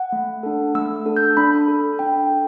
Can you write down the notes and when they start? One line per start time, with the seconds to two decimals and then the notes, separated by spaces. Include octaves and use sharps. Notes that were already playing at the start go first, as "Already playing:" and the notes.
Already playing: F#5
0.12 A3
0.43 D4 A4
0.74 A3 E6
1.05 D4 A4
1.17 G6
1.37 D4 B5
1.68 A4
1.99 D4 G5
2.30 A4